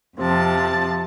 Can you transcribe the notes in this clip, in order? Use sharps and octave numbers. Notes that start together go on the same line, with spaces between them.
F2 C3 F3 A5